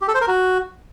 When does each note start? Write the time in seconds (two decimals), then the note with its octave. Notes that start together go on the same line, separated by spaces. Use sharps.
0.02 G4
0.08 A4
0.15 C5
0.21 A#4
0.28 F#4